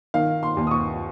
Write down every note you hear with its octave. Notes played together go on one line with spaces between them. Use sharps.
D#3 F5
C6
D#2
D#6
C#6